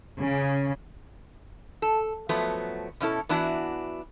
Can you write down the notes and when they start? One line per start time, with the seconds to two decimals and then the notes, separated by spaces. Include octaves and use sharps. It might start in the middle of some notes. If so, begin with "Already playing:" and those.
0.19 C#3
1.82 A4
2.29 F3 F#3 A3 B3
3.00 B2 C#4 E4 A4
3.29 E3 B3 D4 E4 F#4